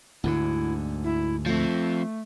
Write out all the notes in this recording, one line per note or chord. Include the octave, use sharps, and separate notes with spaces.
D2 G#2 D3 E4
E4
F3 A3 C4